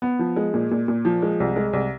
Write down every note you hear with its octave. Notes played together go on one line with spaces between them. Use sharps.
B3
F3
G#3
A#2
A#2
A#2
F3
G#3
C2
G#3
C2